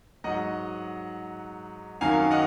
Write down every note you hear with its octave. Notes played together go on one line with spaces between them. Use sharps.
G#2 F#3 D#5 F#5
F#2 D#3 F#3 F5 G#5
D#5 F#5